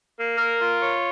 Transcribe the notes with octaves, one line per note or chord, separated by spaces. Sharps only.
A#3
A#4
F4
C#5